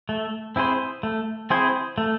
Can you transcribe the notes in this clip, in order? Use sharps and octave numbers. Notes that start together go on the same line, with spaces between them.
A3
C4 E4 G#4 C5
A3
C4 E4 G#4 C5
A3